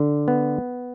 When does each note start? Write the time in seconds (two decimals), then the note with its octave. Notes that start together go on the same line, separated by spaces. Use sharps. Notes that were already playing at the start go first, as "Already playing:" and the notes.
Already playing: D3
0.28 B3